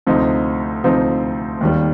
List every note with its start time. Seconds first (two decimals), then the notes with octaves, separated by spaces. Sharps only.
0.07 D2 C3 F3 C4 D#4
0.84 D2 C3 F3 C4 D#4
1.61 D#2 D#3 G3